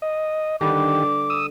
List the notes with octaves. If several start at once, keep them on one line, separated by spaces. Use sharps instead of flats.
D#5
D3 D#3 G3 G4 B4 D6
D#6 E6